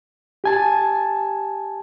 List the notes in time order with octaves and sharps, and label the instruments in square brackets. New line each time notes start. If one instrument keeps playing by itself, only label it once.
[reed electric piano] G4 G#5 A5